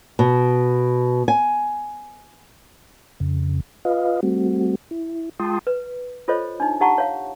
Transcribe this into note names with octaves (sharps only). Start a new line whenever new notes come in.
B2
G#5
F2 C#3
F4 B4 D#5 F5
G3 A3 C4 F#4
E4
G#3 F4 G5 A5 C6 D#6
B4
F4 A4 C5 C#5 D#5
D4 D#4
D#4 G4 F#5 A5 A#5 C#6
C#5 F5